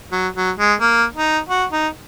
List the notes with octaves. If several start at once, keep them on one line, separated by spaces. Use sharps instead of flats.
F#3
F#3
G#3
A#3
D#4
F#4
D#4